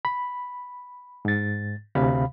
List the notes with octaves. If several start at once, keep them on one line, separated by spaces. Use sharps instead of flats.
B5
G#2 A6
D2 C3 F5 B5